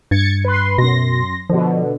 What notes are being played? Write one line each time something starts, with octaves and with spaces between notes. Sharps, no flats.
G2 G#6 A6 C#7
B4 C6
F#2 B2 C6 A#6
B2 D3 F3